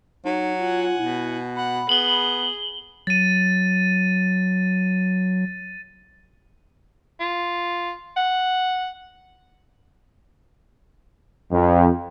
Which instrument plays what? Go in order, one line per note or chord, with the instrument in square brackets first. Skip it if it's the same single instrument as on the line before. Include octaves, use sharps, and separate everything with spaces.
[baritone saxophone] F#3 [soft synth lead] D#4
[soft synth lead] F4 [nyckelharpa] F#5 G#5
[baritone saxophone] B2 [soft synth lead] E4
[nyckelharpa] F#5 [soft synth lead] B5
[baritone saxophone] B3 [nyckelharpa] G#4 [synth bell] F#7 G7
[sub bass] F#3 [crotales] A6 D#7
[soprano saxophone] F4
F#5
[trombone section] F2